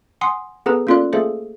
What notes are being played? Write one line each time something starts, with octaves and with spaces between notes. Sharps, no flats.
F#5 G#5 C6 D#6 C7
B3 G#4 A4 B4 A#5
A#3 C#4 F4 A4 D5 F#6
A3 A#3 G#4 A4 C5